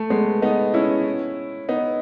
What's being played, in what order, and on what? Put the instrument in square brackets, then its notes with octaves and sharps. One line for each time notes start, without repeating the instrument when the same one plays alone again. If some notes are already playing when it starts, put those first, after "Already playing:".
Already playing: [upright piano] A3
G#3 B3
B3 D#4
C#4 E4
B3 D#4